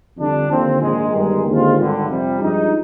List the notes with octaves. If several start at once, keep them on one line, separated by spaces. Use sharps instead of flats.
F2 D3 G3 D4
D#2 D3 F3 C4 F4
A#1 G#2 D#3 G#3
G1 G2 D#3 G#3
D#2 D3 G#3 C4 F4
G#1 G2 D3
F2 C3 G3
G2 F3 G#3 D#4